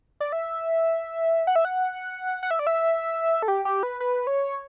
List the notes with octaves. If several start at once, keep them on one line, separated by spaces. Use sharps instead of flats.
D5
E5
F#5
E5
F#5
F#5
E5
D5
E5
A4
G4
G4
B4
B4
C#5